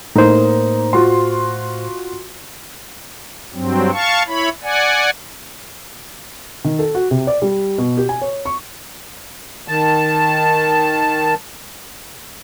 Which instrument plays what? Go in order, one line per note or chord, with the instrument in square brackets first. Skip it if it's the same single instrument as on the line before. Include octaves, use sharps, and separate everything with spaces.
[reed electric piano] A2 C5 [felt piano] A#3 D#4
[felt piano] F4 F#4 C6
[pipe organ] G2 F#3 C4
F5 A5 C#6
E4 C#5 B5
D5 F#5 G#5
[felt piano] D#3
A4
F#4
C3
D5
G3
B2
G4
G#5
C#5
C#6
[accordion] D#3 A5